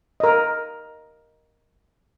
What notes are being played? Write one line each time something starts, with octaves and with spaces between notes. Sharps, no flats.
A#4 D#5